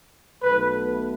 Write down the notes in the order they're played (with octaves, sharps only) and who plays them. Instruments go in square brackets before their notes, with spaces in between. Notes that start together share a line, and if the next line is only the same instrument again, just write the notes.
[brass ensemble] B1 B2 A3 B4